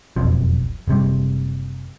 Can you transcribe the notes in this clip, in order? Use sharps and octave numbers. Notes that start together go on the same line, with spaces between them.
E1 B1 F2 F3
F#1 C3 G3